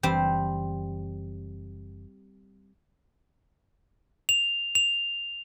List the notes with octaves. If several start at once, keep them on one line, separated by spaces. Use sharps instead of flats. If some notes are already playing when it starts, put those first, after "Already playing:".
F#1 E3 G3 C4 C5
F7
F7